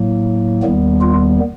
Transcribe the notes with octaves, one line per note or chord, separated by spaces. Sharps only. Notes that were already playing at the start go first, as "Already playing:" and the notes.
Already playing: A2 F#3 A#3
D#2 D#3 G3 B3
F4